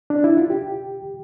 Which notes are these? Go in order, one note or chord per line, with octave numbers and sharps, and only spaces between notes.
D4
E4
F4
G4